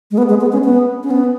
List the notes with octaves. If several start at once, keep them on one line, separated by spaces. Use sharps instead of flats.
G#3
B3
G#3
B3
C#4
B3
C#4
B3